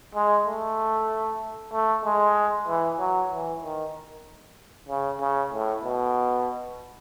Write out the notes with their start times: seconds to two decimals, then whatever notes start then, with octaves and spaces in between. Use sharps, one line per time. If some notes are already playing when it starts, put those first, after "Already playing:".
0.15 G#3
0.46 A3
1.73 A3
2.05 G#3
2.68 E3
2.99 F#3
3.31 E3
3.63 D#3
4.89 C#3
5.21 C#3
5.53 A2
5.84 B2